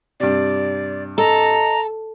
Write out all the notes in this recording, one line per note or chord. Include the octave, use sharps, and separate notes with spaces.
G2 C3 D5
A4 D#5 A#5